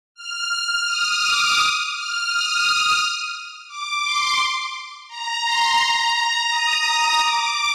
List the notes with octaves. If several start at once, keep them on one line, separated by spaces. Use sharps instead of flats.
F6
D#6
D6
D#6
F6
D#6
D6
C6
A#5
C6
A#5
D#6
D#6
D6